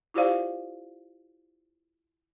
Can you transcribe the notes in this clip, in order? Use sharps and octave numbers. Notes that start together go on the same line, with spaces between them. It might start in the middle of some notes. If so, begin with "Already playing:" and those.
E4 F4 G4 C5 D5 F5